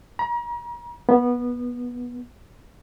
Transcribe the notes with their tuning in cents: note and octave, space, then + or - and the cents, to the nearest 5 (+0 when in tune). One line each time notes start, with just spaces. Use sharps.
A#5 +40
B3 -15